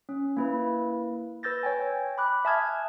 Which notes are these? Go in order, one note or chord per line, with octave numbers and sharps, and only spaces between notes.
C#4
A#3 E4 B4
B4 E6 G6 A6 A#6
C#5 G5 G#5
B5 D6 F#6
E5 G#5 A5 D#6 F6 G#6